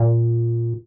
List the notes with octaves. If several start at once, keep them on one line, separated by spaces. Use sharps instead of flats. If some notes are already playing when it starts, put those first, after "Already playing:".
Already playing: A#2